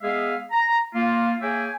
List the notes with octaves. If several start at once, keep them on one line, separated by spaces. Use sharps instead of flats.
G#3 B3 G#4 E5 F5
A#5
A#3 F4
A#3 G#4 C#5 E5 G5 G#5